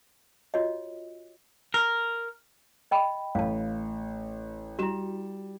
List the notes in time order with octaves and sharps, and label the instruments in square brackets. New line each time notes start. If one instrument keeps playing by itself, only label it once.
[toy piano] F4 F#4 C#5 D#5
[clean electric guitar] A#4
[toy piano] D#5 G5 B5
[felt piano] A1 [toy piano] F5 A5
[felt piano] G3 E7 [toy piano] E4 F#4